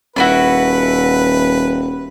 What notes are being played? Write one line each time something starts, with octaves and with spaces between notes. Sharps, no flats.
D#1 D4 E4 F#4 B4